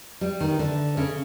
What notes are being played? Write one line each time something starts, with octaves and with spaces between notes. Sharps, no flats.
G3
D#3
D3
C#3